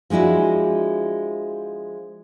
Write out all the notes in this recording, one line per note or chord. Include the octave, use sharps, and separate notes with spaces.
F3 G#3 D4 E4 F#4